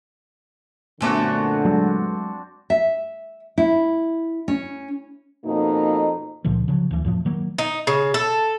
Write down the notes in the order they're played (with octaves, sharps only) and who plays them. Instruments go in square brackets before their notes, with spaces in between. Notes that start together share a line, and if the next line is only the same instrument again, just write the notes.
[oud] F#2 A3 B3 [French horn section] A#2 D3 [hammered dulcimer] C4 D4 F#4
[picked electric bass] F#3 G#3
[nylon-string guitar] E5
E4
C#4
[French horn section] F2 B2 A#3 D#4
[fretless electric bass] C#2 A#2 D3 F3
C#3 F3 F#3
D2 E3
F2 A2 F3
D#3 F#3 A#3
[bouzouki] D#4
C#3
A4